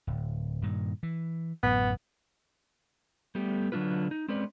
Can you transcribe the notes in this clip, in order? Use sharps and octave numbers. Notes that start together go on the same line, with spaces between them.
D1
G2 A#2 D#3
E3
A1 F#2 A2 B3
G3 A3 B3 G4
D3 F#3 A#3 D4 F4 B4
D#4
G#3 C4 C#4 B4 D5